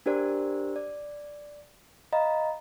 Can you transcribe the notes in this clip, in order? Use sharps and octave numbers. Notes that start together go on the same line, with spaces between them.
D4 G4 A#4 C5 D5
D5
D#5 F5 A#5 B5